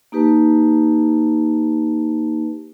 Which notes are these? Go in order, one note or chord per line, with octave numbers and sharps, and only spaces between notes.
A#3 D#4 G4 B4 A5